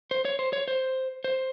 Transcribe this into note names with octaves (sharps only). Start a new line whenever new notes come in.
C5
C#5
C5
C#5
C5
C5